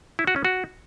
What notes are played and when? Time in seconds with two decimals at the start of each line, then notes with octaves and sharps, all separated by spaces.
0.19 E4
0.27 F#4
0.36 C#4
0.45 F#4